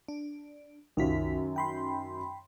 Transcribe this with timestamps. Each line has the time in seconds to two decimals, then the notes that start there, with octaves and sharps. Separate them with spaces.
0.08 D4
0.97 C2 F#2 D#3 F4 B6
1.56 G5 B5 C6